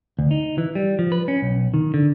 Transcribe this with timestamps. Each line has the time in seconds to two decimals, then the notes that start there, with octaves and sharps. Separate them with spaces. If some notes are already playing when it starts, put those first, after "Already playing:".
0.19 D2
0.31 D#4
0.58 E3
0.75 G3
0.99 F3
1.12 B4
1.28 C#4
1.42 B1
1.74 D#3
1.94 D3